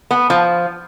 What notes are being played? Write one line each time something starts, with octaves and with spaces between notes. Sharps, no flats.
B3
F3